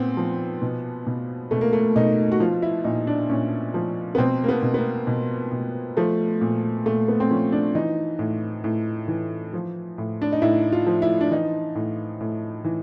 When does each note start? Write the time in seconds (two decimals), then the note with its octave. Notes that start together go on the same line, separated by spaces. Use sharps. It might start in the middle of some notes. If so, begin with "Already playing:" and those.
Already playing: A#2 B3 C4
0.17 F3
0.62 B2
1.07 B2
1.51 B2 A3
1.61 A#3
1.73 A3
1.96 B2 D#4
2.32 F#4
2.40 F3 F4
2.62 E4
2.84 A#2 D#4
3.07 D4
3.29 A#2 C#4
3.74 F3
4.15 B3
4.18 B2 C4
4.44 A#3
4.49 B3
4.62 B2
4.74 B3
4.79 A#3
5.07 B2
5.52 B2
5.97 F3 A3
6.41 A#2
6.86 A#2 A3
7.08 B3
7.20 C4
7.31 F3 C#4
7.52 D4
7.75 E3 D#4
8.19 A2
8.64 A2
9.08 E3
9.53 F3
9.98 A2
10.22 D4
10.32 D#4
10.42 A2 E4
10.72 F4
10.87 F3
11.02 E4
11.21 D4
11.31 E3 D#4
11.75 A2
12.20 A2
12.64 E3